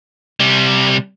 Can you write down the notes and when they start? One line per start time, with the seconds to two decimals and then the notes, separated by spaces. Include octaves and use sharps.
0.40 C3 G3